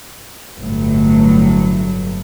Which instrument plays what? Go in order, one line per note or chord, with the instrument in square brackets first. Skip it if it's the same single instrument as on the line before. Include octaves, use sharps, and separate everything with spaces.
[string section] G1 A2 F#3